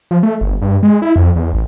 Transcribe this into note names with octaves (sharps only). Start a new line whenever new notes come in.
F3
A3
G1
G2
G#3
E4
F2
E2
A1